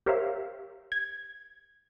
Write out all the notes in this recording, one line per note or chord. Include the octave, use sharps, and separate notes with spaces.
G4 A#4 C5 C#5 E5 F5
G#6